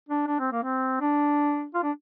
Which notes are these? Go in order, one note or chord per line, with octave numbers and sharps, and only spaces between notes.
D4
D4
C4
A#3
C4
D4
F4
D4